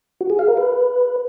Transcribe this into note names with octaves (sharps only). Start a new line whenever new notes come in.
F#4
G#4
F5
A#4
B4